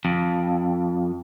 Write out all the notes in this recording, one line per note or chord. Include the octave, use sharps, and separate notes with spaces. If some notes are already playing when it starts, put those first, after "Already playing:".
F2